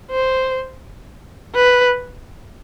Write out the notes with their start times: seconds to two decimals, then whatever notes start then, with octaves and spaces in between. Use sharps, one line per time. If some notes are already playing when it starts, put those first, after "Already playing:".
0.11 C5
1.55 B4